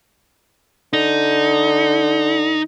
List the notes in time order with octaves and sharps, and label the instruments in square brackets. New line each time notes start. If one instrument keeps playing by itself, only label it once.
[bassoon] D3 [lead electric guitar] D#4